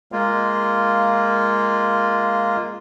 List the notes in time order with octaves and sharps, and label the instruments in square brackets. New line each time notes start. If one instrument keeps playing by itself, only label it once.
[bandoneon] G#3 A#3 F4